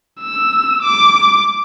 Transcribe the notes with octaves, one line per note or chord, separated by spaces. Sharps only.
E6
D6